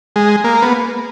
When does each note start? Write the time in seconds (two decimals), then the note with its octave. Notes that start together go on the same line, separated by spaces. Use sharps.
0.16 G#3
0.44 A#3
0.62 B3